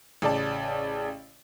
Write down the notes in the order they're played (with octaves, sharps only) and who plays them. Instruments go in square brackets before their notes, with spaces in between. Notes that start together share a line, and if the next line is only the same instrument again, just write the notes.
[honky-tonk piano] A1 C#3 D5 A5